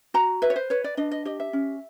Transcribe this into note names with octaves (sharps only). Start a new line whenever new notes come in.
F#4 A#5
B4 E5
C#5
C5
B4 C#5
D5
D4 D#5
D#5
G4 D#5
E5
C#4